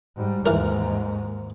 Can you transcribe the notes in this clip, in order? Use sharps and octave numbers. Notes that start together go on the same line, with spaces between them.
G#2 G3
D#2 G#2 E3 A#4